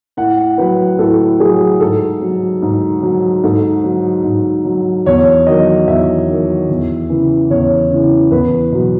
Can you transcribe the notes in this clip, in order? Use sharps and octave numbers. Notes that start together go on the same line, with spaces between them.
A2 F#5
F#3 B4
A2 A4
F#3 G#4
G#2 A4
F#3
G#2
F#3
G#2 A4
F#3
G#2
F#3
E2 C#5
D#3 F#3 D#5
E2 E5
D#3 F#3
E2
C#3 E3
E2 C#5
C#3 E3
E2 B4
B2 F#3